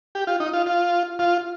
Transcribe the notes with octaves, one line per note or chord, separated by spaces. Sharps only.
G4
F4
D#4
F4
F4
F4